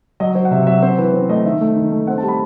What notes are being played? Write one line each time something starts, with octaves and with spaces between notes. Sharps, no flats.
F#3 D#5
F#3 C5
F#5
C3 E5
F#5
F#3 E5
C4 C5
E3 B4
C4 C5
A3 D#5
D#3 E5
A3
D#3
A3
C4 F#5
A5
G3
B5